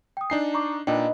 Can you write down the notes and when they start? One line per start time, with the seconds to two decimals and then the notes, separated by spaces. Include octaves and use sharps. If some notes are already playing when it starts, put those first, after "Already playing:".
0.17 G5 D#6
0.30 D4 D#4 G#5 C7
0.54 A#5 C#6 D6
0.87 A#2 D4 D#4 B4 G5